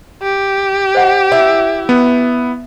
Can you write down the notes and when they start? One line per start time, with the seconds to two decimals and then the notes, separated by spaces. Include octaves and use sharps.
0.22 G4
0.95 C5 D#5 F#5
1.32 E4
1.89 B3